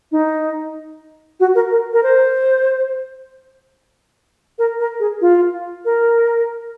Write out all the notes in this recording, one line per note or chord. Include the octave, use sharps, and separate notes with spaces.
D#4
F#4
A#4
A#4
A#4
C5
A#4
A#4
G#4
F4
A#4